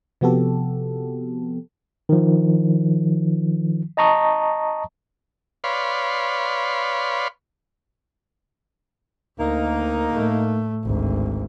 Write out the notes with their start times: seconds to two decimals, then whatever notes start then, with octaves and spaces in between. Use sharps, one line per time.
0.21 C3 F3 B3 F#4 G4 A4
2.09 D#3 F3
3.97 D#5 A5 A#5 C#6 D#6
5.64 B4 C#5 D5 F5 B5 C6
9.39 D2 A#3 D#4
10.11 A2 A3
10.84 G#1 D2